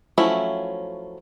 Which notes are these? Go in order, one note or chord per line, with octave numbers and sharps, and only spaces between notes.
F3 F#3 A3 C#4 E4